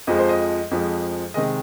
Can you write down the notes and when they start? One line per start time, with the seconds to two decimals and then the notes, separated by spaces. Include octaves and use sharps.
0.07 F2 F3 G#3 D#5
0.19 C5
0.29 D#5
0.71 F2 F3 G#3
1.34 C3 D#3 G#3 D#5